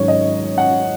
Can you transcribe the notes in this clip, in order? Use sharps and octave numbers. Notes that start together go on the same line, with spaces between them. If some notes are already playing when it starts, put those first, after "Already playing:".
Already playing: G#2 D#3 F#3 C#4 C#5
D#5
F#5